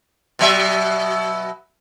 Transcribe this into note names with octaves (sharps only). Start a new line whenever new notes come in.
B2 F#3 E5